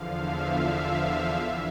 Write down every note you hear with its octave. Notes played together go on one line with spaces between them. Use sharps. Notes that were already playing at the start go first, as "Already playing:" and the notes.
Already playing: E2 D3 F3 F5
E5
E2 E3 E5